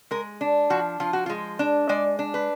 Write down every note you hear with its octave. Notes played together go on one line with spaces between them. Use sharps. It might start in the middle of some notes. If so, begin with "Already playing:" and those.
G#3 A#4
D4
F3 F#4
F3 F4
F#4
F4
G#3
D4
G#3 D5
D4
B4